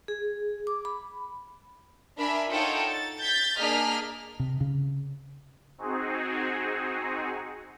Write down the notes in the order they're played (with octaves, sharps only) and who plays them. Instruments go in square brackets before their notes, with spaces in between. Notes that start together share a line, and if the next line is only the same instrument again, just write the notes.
[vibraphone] G#4
D6
B5
[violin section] D4 A#4 E5 G#5 B5
D#4 F4 A4 C#5 F#5 G5
A6
G6 A6 B6
A#3 D4 G#4 D#5 F6 B6
[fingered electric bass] C3
C#3
[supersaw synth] C4 D#4 F#4 G#4